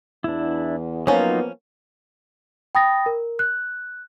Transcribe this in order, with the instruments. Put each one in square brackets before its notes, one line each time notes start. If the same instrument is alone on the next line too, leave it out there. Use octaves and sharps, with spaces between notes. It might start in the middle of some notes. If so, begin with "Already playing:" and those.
[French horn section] E2 [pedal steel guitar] D4 E4
[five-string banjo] F3 C#4 [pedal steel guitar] F#3 D#4 F4 [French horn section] A#3 B3
[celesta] G5 B5 D#6 A6 A#6
A#4
F#6